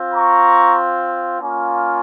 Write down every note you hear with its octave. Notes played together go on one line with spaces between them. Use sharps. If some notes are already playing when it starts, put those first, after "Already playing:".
Already playing: C4 F4
A#5 C#6
A#3 C#4 F4